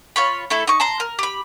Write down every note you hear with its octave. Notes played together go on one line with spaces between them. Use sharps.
F4 C#5 B5
A3 E4 A4
D#4 C#6
A5 A#5 C6
A#4
G4 B5